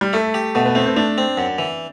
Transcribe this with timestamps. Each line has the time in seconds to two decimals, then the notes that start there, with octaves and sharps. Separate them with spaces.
0.01 G3
0.13 A3 E4
0.34 G4
0.55 B2 A3
0.65 B3
0.75 A3 C4
0.86 C4
0.96 A3 D4
1.18 C4
1.37 F#2
1.58 E3